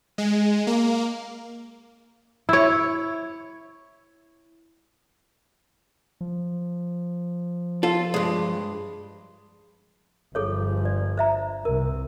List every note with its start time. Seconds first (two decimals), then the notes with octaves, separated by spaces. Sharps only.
0.18 G#3
0.67 A#3
2.49 E4 C#5
6.21 F3
7.83 F4 A4
8.14 G2 G#3
10.35 G1 F3 G#4 A4 C#5
10.85 D5
11.17 C5 E5 A#5
11.65 C2 A#4